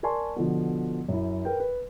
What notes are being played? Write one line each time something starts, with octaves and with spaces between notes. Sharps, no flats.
A#4 D5 G#5 A5 C6 C#6
B2 D3 F3
F#2 E4
A#4 B4 G5
B4